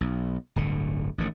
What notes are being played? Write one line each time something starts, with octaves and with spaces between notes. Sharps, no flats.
B1
D1 G1 D3
A1 A2 D#3